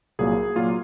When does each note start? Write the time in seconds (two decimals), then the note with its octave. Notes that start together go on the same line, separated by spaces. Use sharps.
0.19 C2 A#2 F#3 A#3 G#4
0.56 A#2 F#3 A#3 F4